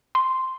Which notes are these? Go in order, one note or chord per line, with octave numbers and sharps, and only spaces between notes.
C6